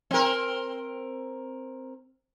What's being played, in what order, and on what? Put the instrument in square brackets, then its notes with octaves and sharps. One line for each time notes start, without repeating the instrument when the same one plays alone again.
[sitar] C4 A#4